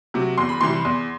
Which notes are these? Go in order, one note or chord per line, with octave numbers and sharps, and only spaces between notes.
C3 F#3
E2 C6
B5
C3 E3 G3 C6
E2